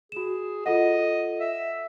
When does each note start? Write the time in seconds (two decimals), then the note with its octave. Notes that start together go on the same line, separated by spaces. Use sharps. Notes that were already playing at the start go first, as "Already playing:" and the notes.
0.12 F#4 G#4 E7
0.66 F4 A4 D#5 F#5
1.40 E5